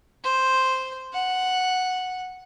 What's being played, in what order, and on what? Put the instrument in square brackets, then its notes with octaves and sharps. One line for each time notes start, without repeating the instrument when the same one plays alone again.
[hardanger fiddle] C5
F#5